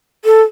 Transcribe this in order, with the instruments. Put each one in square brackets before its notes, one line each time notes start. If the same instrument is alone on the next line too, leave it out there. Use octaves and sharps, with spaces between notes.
[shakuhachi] A4